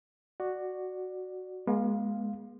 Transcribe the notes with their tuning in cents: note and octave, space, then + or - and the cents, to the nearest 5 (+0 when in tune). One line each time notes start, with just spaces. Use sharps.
F#4 +0 D5 +15
G#3 +5 B3 -40 F5 +0